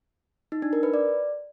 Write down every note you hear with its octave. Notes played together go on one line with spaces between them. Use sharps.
D#4
D4
A#4
B4
D5